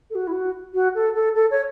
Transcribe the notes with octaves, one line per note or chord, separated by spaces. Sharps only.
A4
F#4
E4
F#4
F#4
A4
A4
A4
C#5